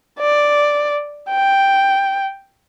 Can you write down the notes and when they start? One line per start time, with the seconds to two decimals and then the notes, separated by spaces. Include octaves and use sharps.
0.19 D5
1.30 G5